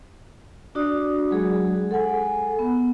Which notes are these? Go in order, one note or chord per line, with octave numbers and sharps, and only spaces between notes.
D4 F#4 D5 D#6
F#3 G#3 G#4
A4 F#5 G#5
B3